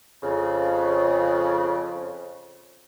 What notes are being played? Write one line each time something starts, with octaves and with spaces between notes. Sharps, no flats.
F2 C#3